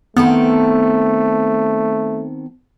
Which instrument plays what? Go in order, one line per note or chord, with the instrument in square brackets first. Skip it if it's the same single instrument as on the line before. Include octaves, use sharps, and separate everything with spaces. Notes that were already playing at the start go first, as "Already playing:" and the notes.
[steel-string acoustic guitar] D#3 C4 A4 [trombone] A3 [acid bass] B3